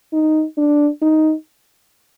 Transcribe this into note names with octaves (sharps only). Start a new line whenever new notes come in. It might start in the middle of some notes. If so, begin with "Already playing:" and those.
D#4
D4
D#4